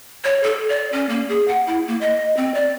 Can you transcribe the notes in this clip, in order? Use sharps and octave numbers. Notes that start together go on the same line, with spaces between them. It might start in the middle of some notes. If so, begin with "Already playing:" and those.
C#5
A4
D5
C#4
A#3
G#4
F#5
E4
A#3
D#5
C4
D5